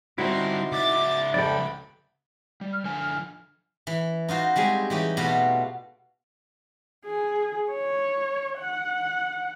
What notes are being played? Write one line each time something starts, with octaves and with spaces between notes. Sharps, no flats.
D3 G3 C4 D#4 E4 F#4 C6
C#2 E5 D6 A6
F2 A4 D5 G5 B5
G3
F6
D3 F3 G#5
E3
D#4 F4 F#4 C5
G3 G#3 C4 G#4
E3 D#4 G4 C#5
B2 G3 A3 F4 F#4
G#4
C#5
F#5